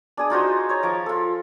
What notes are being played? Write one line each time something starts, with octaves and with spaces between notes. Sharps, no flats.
D4 G#4 D#6
D#4 F4 F#4 C5
C#5 A#5
F3 A#5 D6
F4 A4